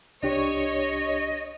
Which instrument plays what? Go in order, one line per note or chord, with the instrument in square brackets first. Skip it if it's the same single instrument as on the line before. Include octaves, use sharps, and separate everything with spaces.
[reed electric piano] C2 D4 G4 [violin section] C#5 [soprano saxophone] D#5